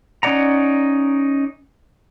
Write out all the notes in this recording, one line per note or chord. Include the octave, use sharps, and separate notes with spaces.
C#4 D#4 D5 F#5 A#5